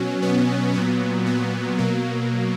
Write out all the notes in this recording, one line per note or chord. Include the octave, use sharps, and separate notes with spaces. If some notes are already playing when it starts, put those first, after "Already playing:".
Already playing: B2 F#3 C#4
B3
A#2 F#3 B3
B3
B2 F#3 A#3